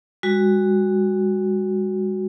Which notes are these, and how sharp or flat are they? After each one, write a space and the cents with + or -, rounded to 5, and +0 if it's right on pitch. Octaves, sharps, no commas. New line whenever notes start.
G#3 -40 F#4 +0